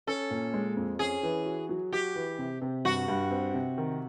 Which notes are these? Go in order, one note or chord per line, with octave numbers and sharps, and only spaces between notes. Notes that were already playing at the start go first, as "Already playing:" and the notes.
C#4 A4
A#2
G#3
F2
C#4 G#4
E3
F#4
F#3
F#4 G4
E3
C3
C3
G2 F#4
G2
C4
C3
D#3